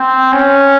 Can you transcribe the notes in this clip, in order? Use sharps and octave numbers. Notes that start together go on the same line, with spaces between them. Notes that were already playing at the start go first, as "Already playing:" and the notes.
Already playing: C4
C#4